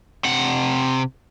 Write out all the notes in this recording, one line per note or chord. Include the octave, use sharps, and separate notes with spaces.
C3 F#5